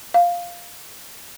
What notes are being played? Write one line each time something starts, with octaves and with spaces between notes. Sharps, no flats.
F5